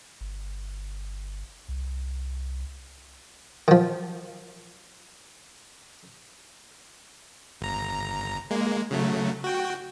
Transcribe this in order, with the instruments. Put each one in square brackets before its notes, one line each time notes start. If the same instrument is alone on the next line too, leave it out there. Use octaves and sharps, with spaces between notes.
[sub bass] G1
C2
[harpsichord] D#3 F3
[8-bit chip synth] G1 A#5
G#3 A#3
C#3 F#3 A3
F#4 G5